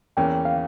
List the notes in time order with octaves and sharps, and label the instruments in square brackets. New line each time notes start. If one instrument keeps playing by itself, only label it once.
[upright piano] E2 E3 A#3 C#4 [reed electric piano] G5
[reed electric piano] F5